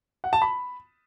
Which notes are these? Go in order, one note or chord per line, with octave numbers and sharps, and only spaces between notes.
F#5
A5
B5